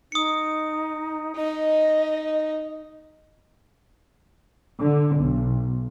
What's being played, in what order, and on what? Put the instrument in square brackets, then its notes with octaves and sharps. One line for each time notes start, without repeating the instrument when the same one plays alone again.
[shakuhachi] D#4 [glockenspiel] D#6 C#7
[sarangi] D#4 [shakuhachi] D#5
[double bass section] D3
B1